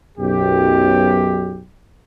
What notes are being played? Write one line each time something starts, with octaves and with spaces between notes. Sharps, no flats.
B1 F#2 G4